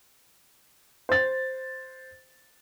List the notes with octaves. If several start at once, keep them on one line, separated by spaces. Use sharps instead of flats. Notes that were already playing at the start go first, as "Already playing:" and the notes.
C5 A6